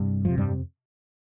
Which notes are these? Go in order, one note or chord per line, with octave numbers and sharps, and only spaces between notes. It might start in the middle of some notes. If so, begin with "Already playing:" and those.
Already playing: G2 C3
F2 C3 F3
G2 G3